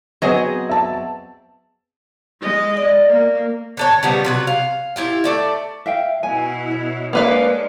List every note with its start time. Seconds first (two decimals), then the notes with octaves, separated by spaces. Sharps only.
0.22 F#3 B3 C4 G#4 D#5
0.69 E5 A5
2.41 G#3 D#5
2.77 D5
3.08 A#3
3.77 D3 A4 C#5
4.03 C#3 F3 G3 B3
4.25 C3 F#3 B4
4.47 F5
4.96 E4 F4 G4
5.24 A3 D5 E5
5.86 E5 F5 G5
6.23 B2 E4 G#5
6.71 C#5
7.13 G#3 A#3 C#4 D4 B4 F5